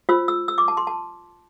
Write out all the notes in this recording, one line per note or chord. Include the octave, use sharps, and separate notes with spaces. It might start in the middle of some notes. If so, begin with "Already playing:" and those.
F4 C5 E6
E6
E6
D6
A5
C6
A5